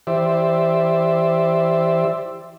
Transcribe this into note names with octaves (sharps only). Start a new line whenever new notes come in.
E3 G4 C5 D5 E5